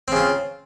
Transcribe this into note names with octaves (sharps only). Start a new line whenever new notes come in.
C#3 C4 F4